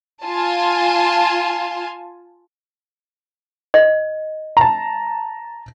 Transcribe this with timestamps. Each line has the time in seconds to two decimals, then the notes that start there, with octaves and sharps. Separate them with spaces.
0.24 F4 G#5 A5
3.74 D#5
4.57 A5 A#5